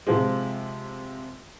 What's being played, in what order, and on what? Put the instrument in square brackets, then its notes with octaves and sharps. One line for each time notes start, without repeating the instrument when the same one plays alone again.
[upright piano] C3 F3 G#3